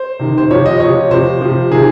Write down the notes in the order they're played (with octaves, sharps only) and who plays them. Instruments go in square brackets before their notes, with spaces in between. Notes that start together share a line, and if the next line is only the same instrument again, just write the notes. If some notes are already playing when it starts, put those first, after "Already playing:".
Already playing: [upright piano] C5
C3 D#3
C5
C3 F3 C#5
D#5
C3 F3 C#5
C3 F3 C5
C3 F3
C3 D#3 G#4